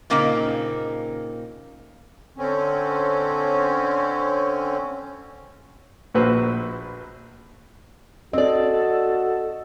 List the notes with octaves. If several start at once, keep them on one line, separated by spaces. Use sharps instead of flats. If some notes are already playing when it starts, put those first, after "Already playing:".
A#2 C#3 A#3 C4 D#4
D3 C4 C#4
A#1 A#2 F#4 B4 C5 E6
C4 F#4 A4 D5 D#5